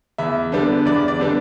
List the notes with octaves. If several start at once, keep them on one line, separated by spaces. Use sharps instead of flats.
E2 E5
D3 G3 B3
E2 D5
D5
D3 G3 B3